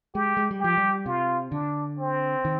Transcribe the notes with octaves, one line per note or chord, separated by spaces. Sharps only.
G#3 G4
G#3
G3
F3 G4
G3
C3 F4
D3 D4
C4
D#3